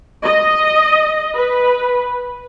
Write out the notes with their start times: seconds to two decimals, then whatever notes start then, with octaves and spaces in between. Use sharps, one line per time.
0.24 D#5
1.35 B4